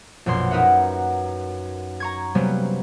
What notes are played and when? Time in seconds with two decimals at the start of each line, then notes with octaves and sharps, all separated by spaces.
0.26 A#1 F#2 B2 C6
0.51 D#4 A#4 B4 E5 F#5
2.00 A#5 C#6 G#6
2.35 C3 F#3 G3 A#3 B3 C#4